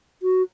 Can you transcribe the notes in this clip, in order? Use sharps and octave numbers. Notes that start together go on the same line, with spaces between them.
F#4